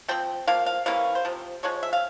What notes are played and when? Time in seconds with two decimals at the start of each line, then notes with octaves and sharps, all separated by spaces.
0.08 F3 C4 G5
0.47 F3 A#3 F5
0.66 F5
0.86 C3 E3 A#3 C#4 F5
1.15 C5
1.25 C3 F3
1.63 F3 G#3 C#4 C#5
1.83 E5
1.93 F5